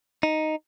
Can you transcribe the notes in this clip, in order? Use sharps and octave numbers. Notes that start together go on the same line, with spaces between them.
D#4